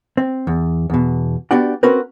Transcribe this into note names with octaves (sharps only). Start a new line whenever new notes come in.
C4
E2
E2 B2
B3 D4 F#4 G4 D5 F#5
C4 C#4 F#4 A#4 B4